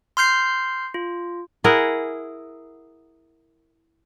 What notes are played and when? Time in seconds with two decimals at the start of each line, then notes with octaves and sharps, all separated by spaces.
0.17 C6 F6 G6 C7
0.94 F4
1.64 E4 G#4 A#4 F#5